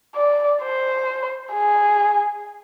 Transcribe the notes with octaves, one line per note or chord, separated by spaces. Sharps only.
D5
C5
G#4